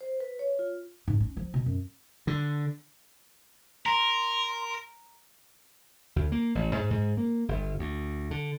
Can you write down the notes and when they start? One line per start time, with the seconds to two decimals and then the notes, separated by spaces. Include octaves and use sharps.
0.01 C5
0.20 B4
0.39 C#5
0.59 F4
1.08 G#2
1.20 C#4
1.37 F3
1.54 B2
1.66 F#2
2.27 D3
3.86 A#4 A#5 C6
6.16 D2
6.32 A#3
6.55 A1
6.77 G#2
6.91 G#2
7.17 A#3
7.49 G1
7.79 D2
8.31 D3